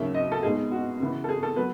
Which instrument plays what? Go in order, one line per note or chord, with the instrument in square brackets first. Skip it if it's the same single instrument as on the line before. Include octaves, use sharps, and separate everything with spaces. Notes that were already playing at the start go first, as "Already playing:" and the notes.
Already playing: [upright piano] D#2 C#3 F#3 C#4 E5
D#5
A4
B2 G#3 D#4 G#4
F#4
C#3 E3 B3
A4
G#4
A4
F#3 B3 B4